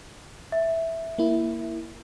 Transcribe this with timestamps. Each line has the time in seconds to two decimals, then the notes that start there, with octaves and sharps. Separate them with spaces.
0.52 E5
1.18 A#3 E4